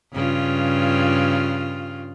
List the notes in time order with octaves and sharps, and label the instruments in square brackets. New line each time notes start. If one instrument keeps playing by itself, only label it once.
[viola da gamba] G2 C#3 F4